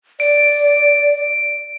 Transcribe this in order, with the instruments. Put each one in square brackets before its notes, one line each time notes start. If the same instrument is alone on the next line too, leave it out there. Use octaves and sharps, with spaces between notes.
[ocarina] D5 [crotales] D7